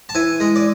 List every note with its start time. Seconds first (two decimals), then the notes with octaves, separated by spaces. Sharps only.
0.09 A5
0.15 E3 G#5
0.40 G#3
0.56 D5